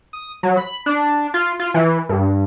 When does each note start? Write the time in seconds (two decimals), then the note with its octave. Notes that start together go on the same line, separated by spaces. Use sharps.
0.13 D#6
0.43 F#3
0.57 B5
0.86 D4
1.34 F4
1.59 F4
1.74 E3
2.09 G2